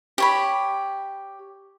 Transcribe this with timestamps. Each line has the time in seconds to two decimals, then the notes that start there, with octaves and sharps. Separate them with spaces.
0.18 G4 C#5 B5